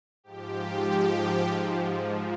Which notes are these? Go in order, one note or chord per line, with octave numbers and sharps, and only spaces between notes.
G#2 F3 G4